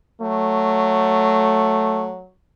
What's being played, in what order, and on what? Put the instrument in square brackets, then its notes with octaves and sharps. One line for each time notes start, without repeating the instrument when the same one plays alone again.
[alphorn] F#3 [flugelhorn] A3